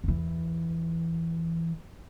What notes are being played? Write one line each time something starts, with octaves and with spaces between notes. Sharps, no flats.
E2 E3